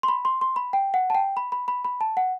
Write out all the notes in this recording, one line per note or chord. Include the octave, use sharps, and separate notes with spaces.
C6
B5
C6
C6
B5
G5
F#5
A5
G5
B5
B5
B5
B5
A5
F#5